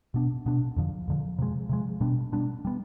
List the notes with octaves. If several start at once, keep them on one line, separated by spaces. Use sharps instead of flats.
B2 B3 D4
B2 B3 D4
F2 D3 F3
F2 D3 F3
C3 F3 G#3
C3 F3 G#3
B2 G3 B3 D4
B2 G3 B3 D4
G3 B3